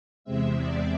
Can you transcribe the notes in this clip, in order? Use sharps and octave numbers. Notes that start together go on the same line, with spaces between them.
E2 C3 G#3 C4 E5
D5